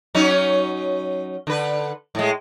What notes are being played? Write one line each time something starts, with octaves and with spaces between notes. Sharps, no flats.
F#3 C#4 D#4
D3 B4
A2 G#3